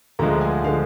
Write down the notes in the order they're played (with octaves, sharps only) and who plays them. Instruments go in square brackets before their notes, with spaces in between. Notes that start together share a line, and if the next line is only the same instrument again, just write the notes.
[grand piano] D2 D3 F3 G#3 A#5
G#5
D3 F3 G#3 F5